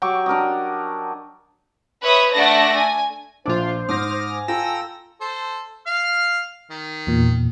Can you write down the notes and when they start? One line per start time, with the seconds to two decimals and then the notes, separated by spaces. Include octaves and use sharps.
0.02 F#3 G4 C#6 D6
0.26 D4 A#4 D5 D#5
2.02 B4 C#5 E5 B5 D#6
2.33 A3 D4 A4 D5 F#5 A#6
2.74 G#5
3.46 A#1 D4 F4 C5 D6
3.89 G#2 D6 D#6 F6 A#6
4.30 G#5
4.48 F4 A4 G5 A#5 E6 A#6
5.21 A4 C5
5.87 F5 F6
6.71 D#3
7.07 E2 A#2